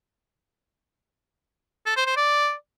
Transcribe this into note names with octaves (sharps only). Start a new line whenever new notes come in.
A4
C5
C5
D5